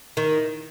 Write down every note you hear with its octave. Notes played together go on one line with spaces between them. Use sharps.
D#3